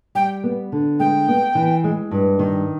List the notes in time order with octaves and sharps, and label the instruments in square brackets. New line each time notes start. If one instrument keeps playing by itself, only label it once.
[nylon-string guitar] G3 [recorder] G5
[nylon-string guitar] B3
D3
[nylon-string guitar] G#3 [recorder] G5
[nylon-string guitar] B3
E3
G#3
G2
D#3